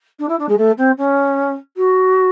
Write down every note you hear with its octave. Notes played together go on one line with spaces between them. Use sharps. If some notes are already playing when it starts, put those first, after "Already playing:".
D4
E4
D4
G#3
A3
C4
C#4
F#4